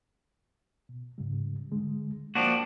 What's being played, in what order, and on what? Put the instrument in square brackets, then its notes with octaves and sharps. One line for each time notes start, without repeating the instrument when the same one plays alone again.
[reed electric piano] B2
G#2 C#3 G3
D3 G#3
[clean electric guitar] F3 D4 F#4 [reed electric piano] A#3 G5